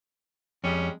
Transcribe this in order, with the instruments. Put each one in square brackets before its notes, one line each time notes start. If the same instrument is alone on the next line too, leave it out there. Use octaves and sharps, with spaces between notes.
[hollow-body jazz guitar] F2 [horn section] G3 G#3 C#4